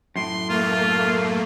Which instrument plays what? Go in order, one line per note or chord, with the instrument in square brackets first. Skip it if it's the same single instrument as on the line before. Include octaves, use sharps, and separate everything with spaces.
[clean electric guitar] F#2 A2 [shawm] C6
[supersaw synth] A3 A#3 [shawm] F4